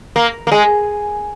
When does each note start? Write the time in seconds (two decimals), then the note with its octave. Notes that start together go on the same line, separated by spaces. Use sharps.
0.16 A#3
0.47 A#3
0.52 G#3